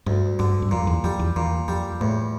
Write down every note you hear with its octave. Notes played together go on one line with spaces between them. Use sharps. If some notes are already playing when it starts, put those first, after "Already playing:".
D2 G2
G2 D3
G2
F2 A#2
E2
F2 G3
E2
E2 A#2
F2 G3
E2 A2